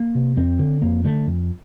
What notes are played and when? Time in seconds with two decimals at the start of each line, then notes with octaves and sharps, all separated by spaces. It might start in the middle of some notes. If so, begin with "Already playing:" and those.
Already playing: A#3
0.15 C3
0.37 F2 C4
0.59 D3
0.82 F2 A#3
1.05 D3 A3
1.27 F2